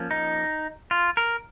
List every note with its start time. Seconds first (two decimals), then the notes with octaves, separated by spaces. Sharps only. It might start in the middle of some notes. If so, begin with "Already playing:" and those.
Already playing: F3 A#3 C#4
0.11 D#4
0.91 F4
1.17 A#4